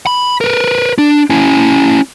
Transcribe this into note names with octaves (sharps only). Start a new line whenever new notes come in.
B5
A#4 B4
D4
C#4 E4